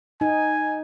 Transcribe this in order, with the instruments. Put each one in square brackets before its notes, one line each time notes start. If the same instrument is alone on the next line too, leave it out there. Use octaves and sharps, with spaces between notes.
[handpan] D#4 [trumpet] G#5